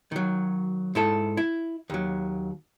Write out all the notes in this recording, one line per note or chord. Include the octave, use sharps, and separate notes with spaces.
D#3 F#3
G#2 E4 A4
E4
D#2 F#3